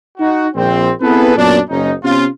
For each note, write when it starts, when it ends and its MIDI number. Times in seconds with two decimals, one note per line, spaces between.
0.18 0.46 63
0.18 0.46 66
0.55 0.90 34
0.55 0.90 60
1.01 1.35 59
1.01 1.35 60
1.01 1.35 64
1.01 1.35 68
1.01 1.35 69
1.01 1.35 71
1.36 1.59 42
1.36 1.59 46
1.36 1.59 59
1.36 1.59 62
1.70 1.91 30
1.70 1.91 61
1.70 1.91 63
2.03 2.25 48
2.03 2.25 59
2.03 2.25 61
2.03 2.25 65